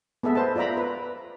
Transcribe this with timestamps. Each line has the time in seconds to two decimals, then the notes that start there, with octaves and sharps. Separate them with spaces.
0.23 B3 G#4 A4 E5
0.35 B4 C5 D#5 A5
0.56 F4 D5 E5 A#5 B5
0.77 B4